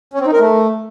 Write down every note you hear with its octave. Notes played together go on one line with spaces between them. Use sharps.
C#4
C4
D#4
A#4
A3